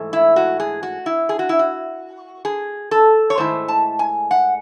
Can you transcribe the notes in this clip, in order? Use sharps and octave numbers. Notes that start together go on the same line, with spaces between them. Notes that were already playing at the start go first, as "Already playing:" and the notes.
Already playing: G#2 E3 A3
E4
F#4
G#4
F#4
E4
G#4
F#4
E4
F#4
G#4
A4
C#5
G#2 D#3 A3 E4 C5
A5
G#5
F#5